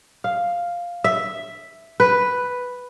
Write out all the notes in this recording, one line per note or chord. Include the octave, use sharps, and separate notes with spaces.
F5
E5
B4